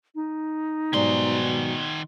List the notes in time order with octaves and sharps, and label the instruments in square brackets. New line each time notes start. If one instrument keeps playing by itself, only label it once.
[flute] D#4
[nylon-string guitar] G#2 F#3 G3 [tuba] B2 [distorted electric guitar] D#3 C6